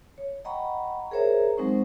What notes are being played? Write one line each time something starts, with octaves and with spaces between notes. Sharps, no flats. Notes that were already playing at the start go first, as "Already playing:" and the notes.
C#5
D#5 F#5 G5 A#5 B5 C#6
G#4 A#4 C5 C#5 E5 A#5
F#3 G#3 C4 D#4 C5 C#6